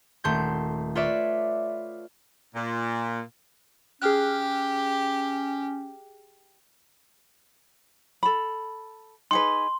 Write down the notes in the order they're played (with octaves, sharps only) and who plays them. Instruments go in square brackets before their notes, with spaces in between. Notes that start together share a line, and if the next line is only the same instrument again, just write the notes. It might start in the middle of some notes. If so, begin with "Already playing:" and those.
[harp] D#1 A3 C6 G6
F4 B4 C#5 D5 E5
[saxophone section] A#2
[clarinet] C#4 [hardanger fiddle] G4 [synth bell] G#4 F6 F#6
[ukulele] A4 B5
[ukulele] D#4 G#4 B4 [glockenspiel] C6